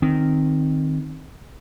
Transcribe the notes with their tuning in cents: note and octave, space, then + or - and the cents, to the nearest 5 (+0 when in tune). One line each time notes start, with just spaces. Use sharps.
D#3 -10 C4 +0